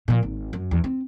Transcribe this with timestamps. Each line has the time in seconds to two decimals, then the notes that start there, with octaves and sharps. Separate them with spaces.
0.08 A#2 F3
0.23 G#1
0.53 F#2
0.71 E2
0.84 C4